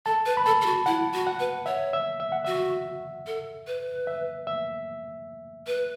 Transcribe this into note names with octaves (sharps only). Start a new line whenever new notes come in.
A4 A5
B4
B5
A4 A5
A4
F#4
E4 F#5
F#4
F#5
B4
C#5 E5
E5
E5
F#5
F#4 E5
A4
B4
E5
E5
B4